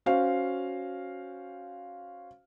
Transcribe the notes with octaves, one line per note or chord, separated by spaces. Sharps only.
C#4 F#4 C5 F5